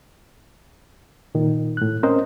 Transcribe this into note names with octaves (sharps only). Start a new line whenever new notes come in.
A#2 D#3
A2 F#6
C4 C#4 A#4 C5 D#5